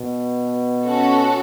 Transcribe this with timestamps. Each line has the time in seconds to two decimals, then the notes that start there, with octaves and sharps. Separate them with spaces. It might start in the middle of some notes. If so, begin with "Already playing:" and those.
Already playing: B2
0.84 C#4 F#4 A4